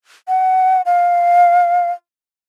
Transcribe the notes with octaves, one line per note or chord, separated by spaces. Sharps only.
F#5
F5